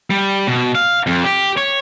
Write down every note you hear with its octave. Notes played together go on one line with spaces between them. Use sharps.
G3
B2
F5
F2
G4
C#5